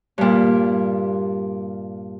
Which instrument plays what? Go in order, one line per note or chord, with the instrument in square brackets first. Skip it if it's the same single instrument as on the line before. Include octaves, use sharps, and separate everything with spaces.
[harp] G2 A#2